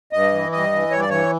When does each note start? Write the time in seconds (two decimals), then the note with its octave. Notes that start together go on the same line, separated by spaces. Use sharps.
0.12 G2 D#5
0.33 E3
0.52 G2 D#5
0.72 E3
0.91 G2 C#5
1.00 D5
1.10 E3 C#5